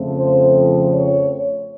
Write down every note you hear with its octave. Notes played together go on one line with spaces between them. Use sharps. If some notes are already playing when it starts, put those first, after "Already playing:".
Already playing: F2 C#3 F3 A3 C4
C5
C#5